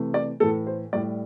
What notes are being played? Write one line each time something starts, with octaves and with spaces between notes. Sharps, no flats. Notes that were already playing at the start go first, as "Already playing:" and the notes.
Already playing: C3 E3 A3
D5
A2 E3 A3 A4
C5
A2 G3 D5